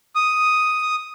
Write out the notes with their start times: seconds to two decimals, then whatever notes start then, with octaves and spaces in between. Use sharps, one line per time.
0.15 D#6